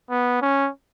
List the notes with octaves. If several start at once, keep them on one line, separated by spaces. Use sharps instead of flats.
B3
C#4